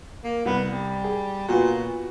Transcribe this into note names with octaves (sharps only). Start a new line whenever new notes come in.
A#3
C2 B3
G3
G#4
A#2 B3 F4 F#4